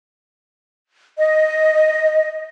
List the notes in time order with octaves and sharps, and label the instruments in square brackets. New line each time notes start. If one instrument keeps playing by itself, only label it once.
[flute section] D#5